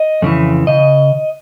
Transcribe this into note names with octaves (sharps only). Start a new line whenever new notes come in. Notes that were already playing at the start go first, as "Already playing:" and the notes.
Already playing: D#5
F2 C#3 E3
C#3 D#5